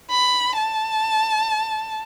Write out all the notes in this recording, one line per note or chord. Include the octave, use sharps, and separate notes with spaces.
B5
A5